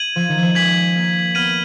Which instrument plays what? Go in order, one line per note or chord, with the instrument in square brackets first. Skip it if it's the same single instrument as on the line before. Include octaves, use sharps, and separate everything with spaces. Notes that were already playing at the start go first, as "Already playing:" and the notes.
Already playing: [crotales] G#6 D#7 F#7
[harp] F3
D#3
F3
[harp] G#3 [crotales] G#6 B6 F#7
[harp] A#3
[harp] B3 [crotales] F6 G#6 D#7 F#7